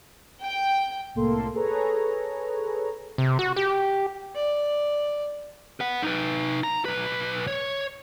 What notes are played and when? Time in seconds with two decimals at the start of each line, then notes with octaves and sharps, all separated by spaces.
0.42 G5
1.15 C2 A2 A#3 A4 C6
1.54 G#4 A4 B4 C#5 A#5
3.18 C3
3.39 F#4
3.56 G4
4.35 D5
5.80 B4 F#5
6.02 D#4 B4
6.63 A#5
6.85 B1 B4
7.47 C#5